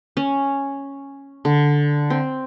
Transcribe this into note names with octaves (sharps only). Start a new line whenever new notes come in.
C#4
D3
C4